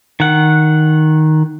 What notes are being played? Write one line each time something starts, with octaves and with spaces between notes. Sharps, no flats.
D#3 F#5